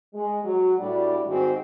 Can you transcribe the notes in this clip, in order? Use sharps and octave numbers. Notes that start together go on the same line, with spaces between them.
G#3
F#3
A2 G3 D4 F#4 D5
G#2 D#3 C4 F#4